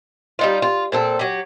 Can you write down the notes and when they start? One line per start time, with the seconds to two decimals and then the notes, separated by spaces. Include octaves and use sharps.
0.39 G3 D#4 F4
0.62 F4
0.92 A#2 C4 A4
1.19 F#3 G4